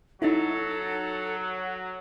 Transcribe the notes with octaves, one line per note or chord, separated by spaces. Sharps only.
F#3 D#4 E4 A4